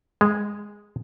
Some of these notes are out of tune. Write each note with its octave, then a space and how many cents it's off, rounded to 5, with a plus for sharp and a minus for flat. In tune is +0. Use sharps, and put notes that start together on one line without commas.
G#3 -10